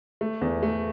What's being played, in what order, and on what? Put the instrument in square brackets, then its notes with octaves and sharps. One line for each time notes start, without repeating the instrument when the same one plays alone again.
[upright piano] A3
E2
A3